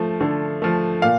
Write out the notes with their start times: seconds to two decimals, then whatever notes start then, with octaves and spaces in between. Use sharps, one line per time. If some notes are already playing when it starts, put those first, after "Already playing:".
Already playing: F3 A3
0.21 D3
0.62 F3 A3
1.02 A#2 F5